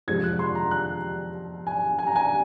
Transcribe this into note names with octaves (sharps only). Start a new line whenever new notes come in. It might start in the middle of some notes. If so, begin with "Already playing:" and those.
F2 C3 F3 G#3 G#6
F#6
C6
A#5
F#6
G#5
G#5
A#5
G#5